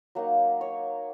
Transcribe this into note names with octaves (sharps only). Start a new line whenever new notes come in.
F#3 A#3 D#4 F#5
C#5